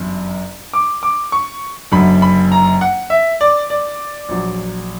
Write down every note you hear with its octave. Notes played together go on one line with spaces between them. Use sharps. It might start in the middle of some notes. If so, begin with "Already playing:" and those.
Already playing: G1 F#2 E3
D6
D6
C#6
F#1 F#2 D3 F#3 B5
B5
A#5
F#5
E5
D5
D5
A#1 A#2 F#3